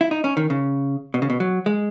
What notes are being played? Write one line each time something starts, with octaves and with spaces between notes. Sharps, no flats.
E4
D#4
C#4
D#3
C#3
B2
C#3
B2
F#3
G#3